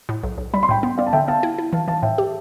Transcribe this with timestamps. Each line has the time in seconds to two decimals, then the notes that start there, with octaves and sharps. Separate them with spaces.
0.09 A2
0.23 B1
0.38 B1
0.54 G3 B5
0.63 C6
0.69 A2 G5 B5
0.83 B3
0.98 B3 D5 F5
1.07 A5
1.13 D3 E5 G5
1.28 B3 F5 A5
1.43 E4
1.58 E4
1.73 E3 F5 A5
1.88 E3 F5 A5
2.02 A2 E5 G5
2.18 G4